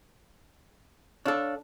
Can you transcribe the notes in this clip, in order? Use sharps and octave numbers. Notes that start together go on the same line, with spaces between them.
D4 A4 C#5 F5